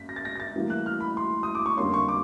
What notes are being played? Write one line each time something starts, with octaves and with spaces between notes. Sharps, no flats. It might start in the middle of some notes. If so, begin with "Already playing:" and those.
Already playing: F#2 A#3 B6
A#6
A6
A#6
A#6
A6
A2 E3 G3 A#3
F#6
F6
B5
C6
D#6
D6
C#6
F2 D3 G3 A#3 C#4 C6
C#6
D6